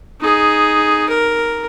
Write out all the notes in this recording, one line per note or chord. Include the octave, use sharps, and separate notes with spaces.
D#4 G#4
A#4